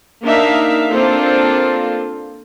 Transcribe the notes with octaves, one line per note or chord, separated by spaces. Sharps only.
A#3 D4 D#4 E5 F5
A#3 C4 D4 F4 A4 C5